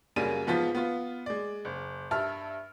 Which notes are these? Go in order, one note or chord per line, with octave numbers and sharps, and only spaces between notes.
F#2 C#3 G3 A#3 D#7
G#2 F3 B3 F4 B6
B3 F4
G#3 D5
F#1
G2 E5 A5 F6